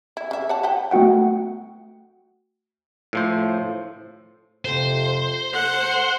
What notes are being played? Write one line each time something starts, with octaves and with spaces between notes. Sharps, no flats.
E4
C#3 E5
C#5 F#5 A5
B4 F#5 G5
A3 B3 F#4 F#5 G5
A2 F3 C5
F2 C3 C5
A4 F#5